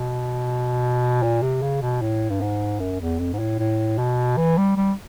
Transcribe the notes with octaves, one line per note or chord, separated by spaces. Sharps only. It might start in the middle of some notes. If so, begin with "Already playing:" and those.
Already playing: B2
A#2
C3
C#3
B2
A2
G2
G#2
F#2
E2
F2
G#2
A2
A2
B2
E3
G3
G3